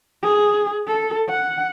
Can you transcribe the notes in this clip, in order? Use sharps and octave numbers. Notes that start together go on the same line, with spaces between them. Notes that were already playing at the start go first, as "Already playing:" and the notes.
G#4
A4
F#5